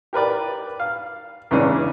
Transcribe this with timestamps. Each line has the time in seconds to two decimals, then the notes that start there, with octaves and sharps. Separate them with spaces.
0.13 G4 A#4 B4 D5
0.80 F5
1.51 E2 C#3 E3 G#3 C#4 D4